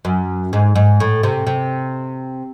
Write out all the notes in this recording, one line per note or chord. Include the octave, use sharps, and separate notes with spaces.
F#2
G#2
G#2
A2
C3
C3